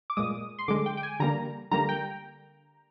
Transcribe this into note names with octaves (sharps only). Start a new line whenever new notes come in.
D6
A#2 G#3 D#6
C6
D3 G#3 D6
G5
G5
G#5
D3 G3 A#3 A#5
D3 G3 A#3 A#5
G5